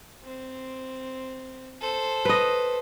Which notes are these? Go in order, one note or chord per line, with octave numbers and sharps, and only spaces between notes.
C4
A4 C5
B4 D#5